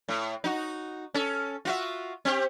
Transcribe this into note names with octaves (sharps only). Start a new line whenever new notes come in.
A2
D#4 F#4
C#4 A4
F4 F#4 E5
C4 G4